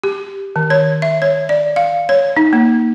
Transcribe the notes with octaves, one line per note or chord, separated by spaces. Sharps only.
G4
D#3
C#5
E5
C#5
D5
F5
C#5
D#4
A#3